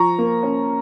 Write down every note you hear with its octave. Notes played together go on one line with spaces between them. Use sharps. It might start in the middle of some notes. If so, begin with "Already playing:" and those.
Already playing: F3 A#5 C#6
A#3
C#4